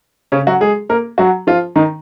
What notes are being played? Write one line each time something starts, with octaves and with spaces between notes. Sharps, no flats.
C#3 C#4
F#3 F#4
G#3 G#4
A#3 A#4
F#3 F#4
F3 F4
D#3 D#4